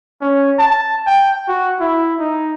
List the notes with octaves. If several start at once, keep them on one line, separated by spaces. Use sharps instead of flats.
C#4
A5
G5
F#4
E4
D#4